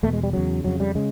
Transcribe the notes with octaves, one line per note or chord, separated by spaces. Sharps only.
E2 B2 A3
G#3
G3
E2 C#3 F#3
F2 C#3 F#3
G3
C#3 G#3